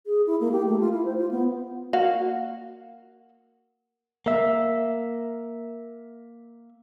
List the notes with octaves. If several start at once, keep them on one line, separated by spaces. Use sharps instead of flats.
G#4
E4
A#3
G4
A3
F4
E4
C5
F4
B3
A#3 F#4 F5
A#3 E5